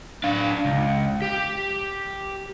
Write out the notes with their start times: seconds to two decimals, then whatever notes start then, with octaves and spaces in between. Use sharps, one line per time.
0.24 D4 F5
0.65 C#2
1.22 G4